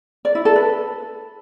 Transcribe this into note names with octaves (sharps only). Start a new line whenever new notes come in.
D5
E4
A4
B4